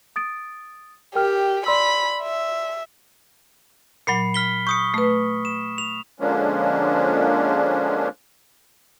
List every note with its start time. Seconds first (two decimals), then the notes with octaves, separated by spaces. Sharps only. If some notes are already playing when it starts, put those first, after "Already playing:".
0.16 D#6 A6 D7
1.15 G4 A#4 G5 F6
1.66 D5 B5 C6 E6
2.22 E5
4.07 A#2 F#3 B5 C7 C#7
4.34 F6 B6 G7
4.67 C#6 D#6 G6 C#7
4.94 A3 B4
5.45 E7
5.78 F7
6.20 D3 F3 G#3 A#3 C#4 D4